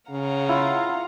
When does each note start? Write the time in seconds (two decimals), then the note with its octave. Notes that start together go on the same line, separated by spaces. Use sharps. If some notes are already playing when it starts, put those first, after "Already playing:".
0.10 C#3 F5 F#5 A#5
0.49 E4 F4